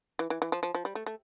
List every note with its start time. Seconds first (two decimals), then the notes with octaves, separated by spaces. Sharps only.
0.19 E3
0.30 E3
0.42 E3
0.52 F3
0.63 F3
0.75 F3
0.85 G3
0.95 A3
1.06 A3